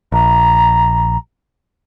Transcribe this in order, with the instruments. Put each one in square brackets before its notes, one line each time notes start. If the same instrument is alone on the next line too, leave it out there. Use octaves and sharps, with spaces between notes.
[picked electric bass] A#1 [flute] A#5